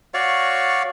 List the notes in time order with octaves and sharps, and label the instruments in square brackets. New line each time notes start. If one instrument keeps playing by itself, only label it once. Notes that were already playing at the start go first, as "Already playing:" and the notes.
[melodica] F#4 C#5 D5 F5